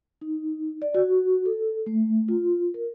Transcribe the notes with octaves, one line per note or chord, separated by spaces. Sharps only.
D#4
D5
F#4
A4
A3
F4
A#4